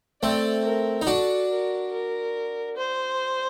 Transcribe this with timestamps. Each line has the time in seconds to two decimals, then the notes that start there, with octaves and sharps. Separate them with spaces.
0.22 A3 C4 D5
0.65 A#4
1.02 D#4
1.07 D4 F#4 A4
1.50 A#4
1.92 A#4
2.77 C5